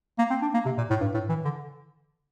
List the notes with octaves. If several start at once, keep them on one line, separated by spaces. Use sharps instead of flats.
A#3
C4
D4
A#3
C3
A#2
A2
G2
A2
E3
D3